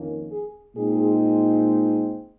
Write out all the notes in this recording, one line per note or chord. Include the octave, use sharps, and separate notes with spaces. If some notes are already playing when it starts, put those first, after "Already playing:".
Already playing: F2 D#3 A#3 C#4
G#4
A#2 G#3 C4 D#4 G#4